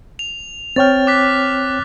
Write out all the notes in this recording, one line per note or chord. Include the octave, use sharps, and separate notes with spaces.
F7
C4 C#5 G5 F6 A6
D6 F#6 B6